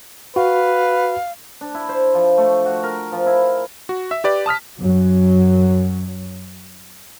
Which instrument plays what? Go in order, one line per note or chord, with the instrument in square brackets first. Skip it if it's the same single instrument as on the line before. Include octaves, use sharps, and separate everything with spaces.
[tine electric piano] F#4 [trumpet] B4 [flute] F5
[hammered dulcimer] D4
E4
C5
F3
A3
F#4
A#4
F3
E4
[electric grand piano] F#4
E5 E6
G4 B4 D5
A5 D#6 F6 B6
[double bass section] F#2 F#3